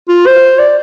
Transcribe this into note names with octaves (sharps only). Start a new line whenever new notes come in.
F4
C5
D5